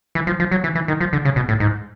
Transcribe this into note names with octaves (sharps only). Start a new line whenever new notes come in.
E3
F3
F3
F#3
E3
E3
D#3
F3
D3
C#3
B2
A2
G#2